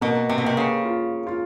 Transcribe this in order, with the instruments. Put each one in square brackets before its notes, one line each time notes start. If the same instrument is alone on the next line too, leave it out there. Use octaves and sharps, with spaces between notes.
[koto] B2 [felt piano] A#3
[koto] C3
B2
[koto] C3 [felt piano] A#3
[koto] C#3
[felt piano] F4
F4